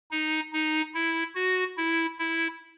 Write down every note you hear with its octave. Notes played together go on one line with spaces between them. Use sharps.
D#4
D#4
E4
F#4
E4
E4